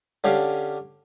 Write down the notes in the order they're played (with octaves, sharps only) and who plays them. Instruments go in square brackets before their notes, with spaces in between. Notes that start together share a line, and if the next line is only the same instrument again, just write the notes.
[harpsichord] D3 C#4 G4 F5